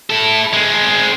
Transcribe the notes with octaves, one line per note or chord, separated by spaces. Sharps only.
E4 A4
G#3 C4